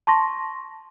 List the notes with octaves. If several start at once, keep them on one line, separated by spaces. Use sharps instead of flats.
A5 C6 C#6 A#6